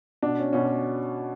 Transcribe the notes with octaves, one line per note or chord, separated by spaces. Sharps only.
B2 D4
C#4
B2 C#4
C#4